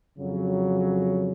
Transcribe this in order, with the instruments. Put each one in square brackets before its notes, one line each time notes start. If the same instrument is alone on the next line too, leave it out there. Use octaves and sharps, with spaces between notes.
[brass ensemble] F2 C#3 F#3